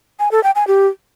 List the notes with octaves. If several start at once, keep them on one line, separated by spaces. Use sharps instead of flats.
G#5
A4
G5
G#5
G4